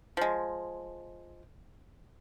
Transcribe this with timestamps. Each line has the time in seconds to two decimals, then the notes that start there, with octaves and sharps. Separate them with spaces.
0.17 F3 G#3